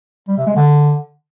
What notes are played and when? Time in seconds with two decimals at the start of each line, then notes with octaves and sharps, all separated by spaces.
0.28 G3
0.37 C3
0.46 G#3
0.56 D3